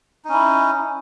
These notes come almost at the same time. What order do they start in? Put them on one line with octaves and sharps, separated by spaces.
D#4 C#4 E4